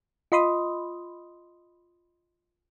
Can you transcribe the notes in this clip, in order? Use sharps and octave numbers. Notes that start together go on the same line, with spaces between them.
F4 D#5 B5 C6 D#6